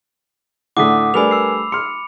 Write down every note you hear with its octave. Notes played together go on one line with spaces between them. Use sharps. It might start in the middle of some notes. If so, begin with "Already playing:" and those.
A2 D3 A3 F#5 D6 D#6 B6
G3 A3 D4 A#4 B4 G#5 B5 F7
E6 C7
C6 F6 C#7